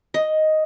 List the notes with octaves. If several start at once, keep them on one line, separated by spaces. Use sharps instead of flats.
D#5